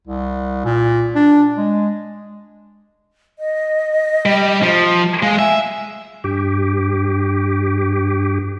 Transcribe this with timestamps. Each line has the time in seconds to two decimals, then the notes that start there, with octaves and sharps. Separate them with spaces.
0.07 C2
0.65 A#2
1.15 D4
1.57 G#3
3.39 D#5
4.26 G3
4.62 F3
5.23 G#3 F5
5.39 E5 G#5
6.24 G2 G4